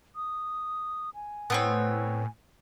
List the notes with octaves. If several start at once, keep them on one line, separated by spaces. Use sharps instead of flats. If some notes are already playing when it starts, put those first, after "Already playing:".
D#6
G#5
A2 B3 C4 C#5